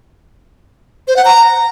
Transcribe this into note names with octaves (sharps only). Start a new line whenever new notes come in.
C5
F#5
A#5